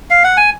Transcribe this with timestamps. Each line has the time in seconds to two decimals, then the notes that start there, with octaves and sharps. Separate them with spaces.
0.10 F5
0.24 F#5
0.37 G#5